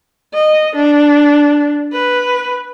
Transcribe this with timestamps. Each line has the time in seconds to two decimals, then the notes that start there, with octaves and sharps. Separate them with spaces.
0.34 D#5
0.76 D4
1.93 B4